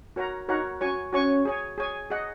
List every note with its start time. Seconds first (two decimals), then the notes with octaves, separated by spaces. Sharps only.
0.16 F#4 A#4 C#5 F#5 A#5
0.48 D#4 F#4 A#4 C#5 F#5 A#5
0.81 C#4 F#4 C#5 G#5 C#6
1.13 C#4 F#4 C#5 G#5 C#6
1.45 G#4 C#5 G#5
1.78 G#4 C#5 G#5
2.11 G#4 D#5 F#5